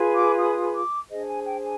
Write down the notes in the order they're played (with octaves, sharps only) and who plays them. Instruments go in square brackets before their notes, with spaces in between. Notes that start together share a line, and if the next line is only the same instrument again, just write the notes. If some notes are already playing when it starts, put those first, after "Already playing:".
Already playing: [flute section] F4 G#4 B4
D6
D#6
D6
D4 G#4 C5 D#5
G#5
G5
G#5